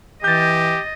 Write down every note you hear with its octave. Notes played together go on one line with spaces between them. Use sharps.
E3 G4 D#5 G6 A6